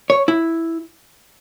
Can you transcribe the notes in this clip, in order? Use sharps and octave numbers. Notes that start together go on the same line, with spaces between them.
C#5
E4